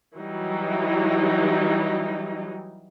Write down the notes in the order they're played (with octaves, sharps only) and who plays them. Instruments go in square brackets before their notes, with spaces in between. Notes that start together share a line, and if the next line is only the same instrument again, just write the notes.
[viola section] E3 F#3 G3 D#4